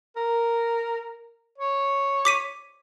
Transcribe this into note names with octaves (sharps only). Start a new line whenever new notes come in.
A#4
C#5
D6 B6 D#7